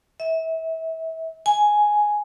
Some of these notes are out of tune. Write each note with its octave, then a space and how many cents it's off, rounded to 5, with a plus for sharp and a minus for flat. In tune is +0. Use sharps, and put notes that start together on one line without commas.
E5 -30
G#5 +5